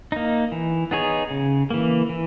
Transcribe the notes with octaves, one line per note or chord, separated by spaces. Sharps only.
A#3 D#4
E3
B3 D#4 G#4 C#5
C#3
E3 A#3
E3